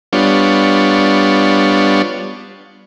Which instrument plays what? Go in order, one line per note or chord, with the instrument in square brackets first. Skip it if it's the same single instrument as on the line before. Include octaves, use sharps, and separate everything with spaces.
[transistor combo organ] G3 B3 D4 F4 C#5